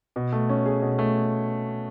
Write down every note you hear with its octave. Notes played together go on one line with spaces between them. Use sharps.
B2
A3
C#4
G#4
B2
A3